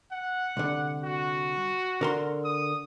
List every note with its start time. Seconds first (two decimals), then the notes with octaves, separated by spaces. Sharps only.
0.12 F#5
0.57 C2 D3
1.04 F#4
2.01 D3 A#4 C6
2.45 D#6